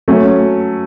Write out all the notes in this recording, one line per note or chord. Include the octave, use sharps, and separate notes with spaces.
F#3 A3 C#4